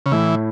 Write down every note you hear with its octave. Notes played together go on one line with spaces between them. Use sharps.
C#3
A2 E3 A3 E4